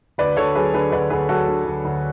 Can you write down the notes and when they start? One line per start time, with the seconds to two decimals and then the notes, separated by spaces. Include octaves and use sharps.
0.18 D2 B4 D5
0.37 D2 A4 C#5
0.55 F#3 G#4 B4
0.74 D3 G#4 B4
0.92 D2 B4 D5
1.10 D2 G#4 B4
1.29 F#3 F#4 A4
1.48 D3
1.66 D2
1.85 D2